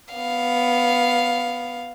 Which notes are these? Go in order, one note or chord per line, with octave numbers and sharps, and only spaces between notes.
B3 F5